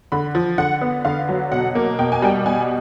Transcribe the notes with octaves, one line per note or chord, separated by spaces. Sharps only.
D3 B5
F3
D3 F#5
B3
D3 F5
F#3
B2 F#5
A#3
B2 G5
G#5
G3 G5
B2 G#5